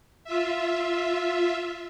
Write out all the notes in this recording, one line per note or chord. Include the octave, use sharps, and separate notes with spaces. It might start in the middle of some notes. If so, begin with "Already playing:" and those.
F4 E5